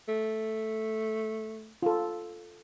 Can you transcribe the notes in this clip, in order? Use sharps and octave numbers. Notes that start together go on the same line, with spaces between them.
A3
F4 A4